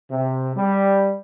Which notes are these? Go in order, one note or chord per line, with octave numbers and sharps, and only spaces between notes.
C3
G3